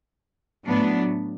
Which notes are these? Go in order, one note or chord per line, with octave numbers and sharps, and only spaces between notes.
A2 F#3 B3 D4